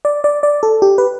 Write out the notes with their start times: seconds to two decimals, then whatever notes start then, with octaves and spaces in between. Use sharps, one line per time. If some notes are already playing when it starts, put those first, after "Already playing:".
0.05 D5
0.24 D5
0.43 D5
0.63 A4
0.82 G4
0.98 B4